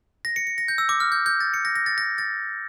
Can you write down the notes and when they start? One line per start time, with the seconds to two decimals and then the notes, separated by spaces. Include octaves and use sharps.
0.25 A#6
0.36 C#7
0.47 C#7
0.58 A#6
0.68 G6
0.78 E6
0.89 D6
1.00 F6
1.12 G6
1.26 G6
1.40 A6
1.54 C#7
1.65 A#6
1.75 A#6
1.86 A6
1.98 A#6
2.18 A6